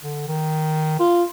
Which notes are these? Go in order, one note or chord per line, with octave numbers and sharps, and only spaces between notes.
D3
D#3
F4